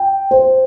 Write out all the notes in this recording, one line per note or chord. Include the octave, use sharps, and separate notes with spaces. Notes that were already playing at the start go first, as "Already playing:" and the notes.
Already playing: G5
C5